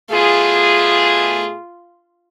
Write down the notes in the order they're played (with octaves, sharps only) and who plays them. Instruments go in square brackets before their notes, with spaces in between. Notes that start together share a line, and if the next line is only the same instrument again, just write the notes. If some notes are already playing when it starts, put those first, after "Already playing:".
[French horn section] B2 A3 G#4 [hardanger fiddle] F4